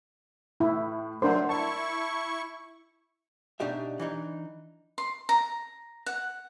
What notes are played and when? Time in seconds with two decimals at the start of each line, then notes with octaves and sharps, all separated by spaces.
0.60 A2 E4
1.22 F#3 A3 D4 A#4 C5 F#5 C6
1.49 E4 A5 C#6
3.60 B2 D4 D#4 G4 E5
3.99 E3 D4 D#4
4.98 C6
5.29 A#5
6.06 F#5